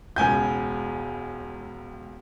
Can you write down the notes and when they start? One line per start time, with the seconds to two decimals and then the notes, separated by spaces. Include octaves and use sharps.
0.16 E1 C#2 G#5 G6